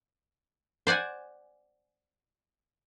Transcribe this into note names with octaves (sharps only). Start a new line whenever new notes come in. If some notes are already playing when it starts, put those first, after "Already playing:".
C5 D5 F#5 G#5